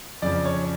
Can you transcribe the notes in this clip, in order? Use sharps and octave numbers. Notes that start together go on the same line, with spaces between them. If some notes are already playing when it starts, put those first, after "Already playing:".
F2 C#3 F3 D5
C#5